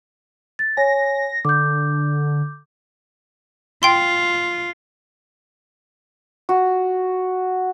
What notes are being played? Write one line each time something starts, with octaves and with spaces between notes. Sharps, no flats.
A6
C#5 G#5 A#6
D3 D6 G6
F4 G5 C6
F#4